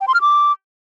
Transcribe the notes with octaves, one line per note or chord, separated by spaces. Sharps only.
G5
C6
F6
D6